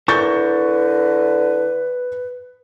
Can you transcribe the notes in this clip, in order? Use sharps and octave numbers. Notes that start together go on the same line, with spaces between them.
D3 E4 A#4 B4 C#5 C#6 G6 A6